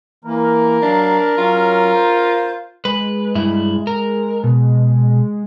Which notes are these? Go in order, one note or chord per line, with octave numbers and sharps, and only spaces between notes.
E3 A#3 A#4
F#3 D4 F5
F#3 C#4 F4
C5
G#3 B4
G2 E4
A#4
B2